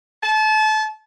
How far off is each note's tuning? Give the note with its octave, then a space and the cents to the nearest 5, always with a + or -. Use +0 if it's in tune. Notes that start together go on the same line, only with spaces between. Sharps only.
A5 -30